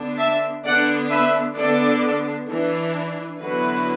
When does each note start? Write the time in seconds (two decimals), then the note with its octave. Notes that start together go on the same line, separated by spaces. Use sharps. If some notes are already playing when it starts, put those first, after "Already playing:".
Already playing: D3 B3 D4
0.18 E5 A5
0.64 D3 B3 D4 D5 F#5
1.10 B4 E5
1.56 D3 B3 D4 A4 D5
2.48 E3 D4
3.40 D3 F#3 B3 E4 F#4 B4